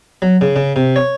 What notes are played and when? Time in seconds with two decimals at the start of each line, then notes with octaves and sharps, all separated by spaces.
0.22 F#3
0.41 C#3
0.56 C#3
0.76 C3
0.96 C#5